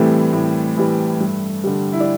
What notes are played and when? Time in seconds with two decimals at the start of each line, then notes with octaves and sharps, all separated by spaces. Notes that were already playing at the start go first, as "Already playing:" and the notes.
Already playing: A2 E3 G3 A3 C4
0.33 A2
0.77 E3 G3
1.20 G2
1.64 D3 G3
1.93 E4
2.00 D4